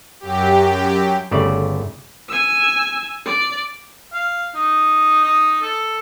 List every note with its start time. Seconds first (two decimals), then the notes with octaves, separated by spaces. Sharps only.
0.20 F#2 G4
1.31 G1 C#3 A3 D5
2.29 G#5 E6
3.26 D5
4.14 F5
4.55 D#4
5.23 D#4
5.62 A4